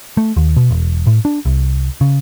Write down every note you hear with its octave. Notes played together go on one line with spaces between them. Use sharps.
A3
D#2
B2
E1
A2
D4
C2
C#3